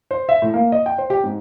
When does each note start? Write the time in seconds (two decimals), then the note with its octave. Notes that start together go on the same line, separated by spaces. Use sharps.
0.11 C5
0.29 E5
0.42 A2
0.54 A#3
0.72 D#5
0.86 G5
0.98 C5
1.10 G4
1.24 G#2